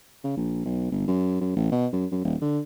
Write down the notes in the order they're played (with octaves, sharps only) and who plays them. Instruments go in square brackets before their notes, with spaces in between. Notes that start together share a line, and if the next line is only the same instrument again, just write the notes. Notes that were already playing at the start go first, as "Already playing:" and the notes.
[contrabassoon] C#3
A#1
B1
G1
F#2
F#2
A1
B2
F#2
F#2
D#1
D3